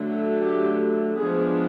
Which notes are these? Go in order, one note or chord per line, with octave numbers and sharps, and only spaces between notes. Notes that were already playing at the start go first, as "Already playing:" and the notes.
Already playing: D3 F#3 A3
G4
F3 G#3 B3 D4 G#4